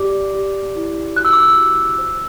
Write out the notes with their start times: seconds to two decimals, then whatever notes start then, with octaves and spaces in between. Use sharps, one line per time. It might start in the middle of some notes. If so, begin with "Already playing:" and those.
Already playing: G4 D5 D6
0.34 G4
0.75 E4
1.16 F#4 F#6
1.25 E6
1.33 D6
1.42 E6
1.57 F#4
1.98 C5